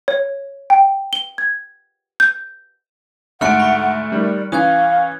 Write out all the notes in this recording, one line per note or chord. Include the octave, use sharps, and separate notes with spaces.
C#5
G5
G7
G#6
G6
D2 G#2 A3 F#5 F6 F#6 C#7 D7
B5 C#6
D#3 G3 D5
E3 C#4 F5 D#6 F#6 G#6